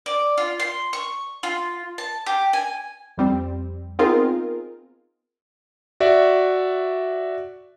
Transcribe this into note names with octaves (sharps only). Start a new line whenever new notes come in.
D5
F4
C6
C#6
F4
A5
G4
G#5
F2 G3 C4
B3 C4 D#4 F4 G#4 A#4
F#4 D5 E5